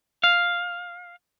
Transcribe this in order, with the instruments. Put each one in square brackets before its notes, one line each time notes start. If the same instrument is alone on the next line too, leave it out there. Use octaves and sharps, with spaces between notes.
[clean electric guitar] F5